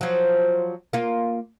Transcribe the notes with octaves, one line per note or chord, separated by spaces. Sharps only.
F3 F#3
A#3 F4